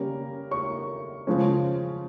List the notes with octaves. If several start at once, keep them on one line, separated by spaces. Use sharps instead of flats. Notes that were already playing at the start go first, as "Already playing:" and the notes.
Already playing: C#3 G3 A#3 C#4 A#4
C#5 C#6
C#3 F3 G#3 C#4